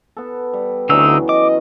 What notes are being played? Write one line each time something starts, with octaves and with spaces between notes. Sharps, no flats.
B3 A4
G3
D2 D3 E3 F#3 C#4 D#4 E6
D#5 D6